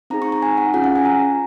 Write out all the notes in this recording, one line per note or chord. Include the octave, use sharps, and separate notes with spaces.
C4 D#4 G#4 A#5
C#6
A#5
G#5
F#5
C#4 F4 G#4 F#5
F#5
G#5
A#5